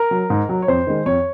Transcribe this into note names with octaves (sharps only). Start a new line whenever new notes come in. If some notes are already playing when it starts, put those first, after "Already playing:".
Already playing: A#4
F#3
G#2
F#3
C#5
F2 C5
D#3 G#3
F2 C#5